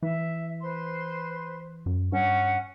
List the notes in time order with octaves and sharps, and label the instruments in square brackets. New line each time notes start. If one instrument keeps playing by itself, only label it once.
[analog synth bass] E3 [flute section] E5
[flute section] B4 C5 C6
[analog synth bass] F#2
[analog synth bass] G2 [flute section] C#4 F#5 C#6